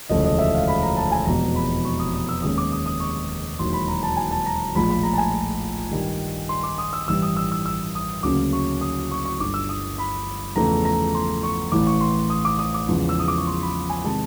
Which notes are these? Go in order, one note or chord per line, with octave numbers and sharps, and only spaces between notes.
E1 D2 C#3 F3 A3 D#5
D#5
E5
F5
B5
A#5
A5
G#5
F1 E2 B2 G#3 A#5
B5
C#6
D#6
D#6
E6
D#2 D#3 G#3 C#4 D#6
D6
D#6
D#6
C#6
E1 D#2 D#3 F#3 C6
B5
A#5
A5
G#5
A5
A#5
A#1 A2 F3 G#3 B5
B5
A#5
A5
G#5
G2 D#3 G3
C6
D6
D#6
E6
A1 G2 E3 G3 E6
D#6
E6
E6
E6
D#6
D2 C#3 F#3 A#3 C#4 D6
C#6
D#6
C#6
C#6
G1 G2 D3 D6
E6
D#6
B5
E2 C#3 F3 A3 A#5
A#5
C6
C#6
A1 A2 E3 D6
C#6
C6
D#6
D6
D#6
D6
E2 C#3 F3 G#3
E6
D#6
D6
C#6
C6
B5
G#5
C3 D#3 G#3 A5